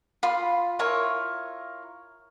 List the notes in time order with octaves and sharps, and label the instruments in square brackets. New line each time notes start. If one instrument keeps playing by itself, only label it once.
[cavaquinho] F4 B5 C6
E4 F4 A#4 C#5